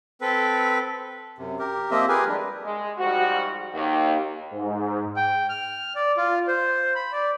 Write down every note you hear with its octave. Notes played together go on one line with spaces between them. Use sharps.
C4 A4 B4
F#2 C3
G4 A#4
F3 A#3 C4 G4 D#5 E5
G4 G#4 A#4 B4 G#5
G3 G#3 D4
G#3
G#2 F3 G3 F#4
D#2
G#2
G5
F6
D5
F4
C5
B5
D5